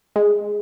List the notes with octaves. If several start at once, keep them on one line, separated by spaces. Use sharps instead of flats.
G#3